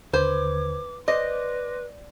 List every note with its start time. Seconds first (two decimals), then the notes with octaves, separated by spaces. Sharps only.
0.13 D#2 D3 B4 C5 D6 G#6
1.08 B4 C5 D5 D#5 C6 D6 A#6